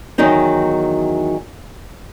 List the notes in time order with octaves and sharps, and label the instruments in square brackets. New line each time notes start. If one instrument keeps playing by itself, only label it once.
[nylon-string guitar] E2 D#3 F#3 D#4 G5